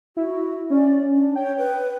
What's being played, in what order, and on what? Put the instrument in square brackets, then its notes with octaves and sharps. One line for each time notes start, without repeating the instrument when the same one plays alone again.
[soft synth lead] E4 [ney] F#4
[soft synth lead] C#4 [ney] D5
[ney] D4
[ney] C#5 [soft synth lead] G5
[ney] B4